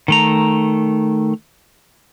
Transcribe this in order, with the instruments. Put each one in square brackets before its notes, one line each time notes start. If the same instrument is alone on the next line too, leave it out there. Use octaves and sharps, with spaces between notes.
[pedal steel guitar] D#3 A3 A#5